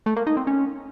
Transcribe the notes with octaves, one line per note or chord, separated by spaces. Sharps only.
A3
A#3
D#4
C4
C#4